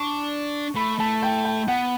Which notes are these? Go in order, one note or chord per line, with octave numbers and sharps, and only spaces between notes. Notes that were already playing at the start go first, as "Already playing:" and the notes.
Already playing: D4 C#6
A3 B5
A3 A5
G5
G5
B3 F#5